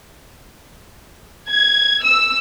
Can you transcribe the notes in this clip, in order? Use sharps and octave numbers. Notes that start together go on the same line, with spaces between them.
G#6
E6